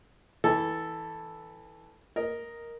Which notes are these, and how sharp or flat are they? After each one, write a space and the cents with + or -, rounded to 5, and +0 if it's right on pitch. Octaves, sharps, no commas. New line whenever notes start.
E3 -15 A4 +0
A#4 +0 D#5 +0